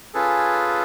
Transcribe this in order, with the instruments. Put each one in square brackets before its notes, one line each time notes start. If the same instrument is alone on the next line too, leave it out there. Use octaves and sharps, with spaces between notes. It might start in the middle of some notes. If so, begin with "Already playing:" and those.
[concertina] C#4 F4 G#4 A4 B4